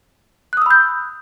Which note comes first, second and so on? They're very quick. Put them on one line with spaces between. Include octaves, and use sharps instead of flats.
F#6 D#6 E6 B5 G6